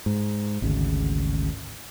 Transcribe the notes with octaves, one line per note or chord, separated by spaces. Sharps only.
G#2
G#1 D2 C#3